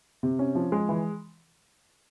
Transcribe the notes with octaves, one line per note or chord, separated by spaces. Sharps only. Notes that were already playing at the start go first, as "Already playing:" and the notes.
C3
C#4
F3
G#3
E3